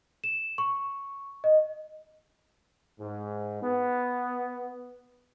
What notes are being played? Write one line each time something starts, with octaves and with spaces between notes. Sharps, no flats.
E7
C#6
D#5
G#2
B3